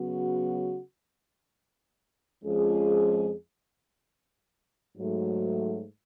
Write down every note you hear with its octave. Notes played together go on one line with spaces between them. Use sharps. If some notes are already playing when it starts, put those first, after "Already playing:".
Already playing: C#3 F#3 B3 F#4
F2 F3 G#3 C#4 G#4
G#2 F#3 A3